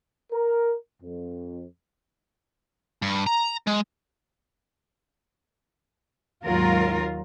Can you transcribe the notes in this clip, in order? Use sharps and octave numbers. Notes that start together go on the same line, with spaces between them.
A#4
F2
G2
A#5
G#3
D#2 G#2 F#3 F4 A#4